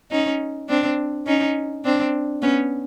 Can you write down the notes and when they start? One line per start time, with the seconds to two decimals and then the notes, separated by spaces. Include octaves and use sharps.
0.11 C#4 D#4
0.69 C4 D4
1.26 C#4 D#4
1.85 C4 D4
2.42 B3 C#4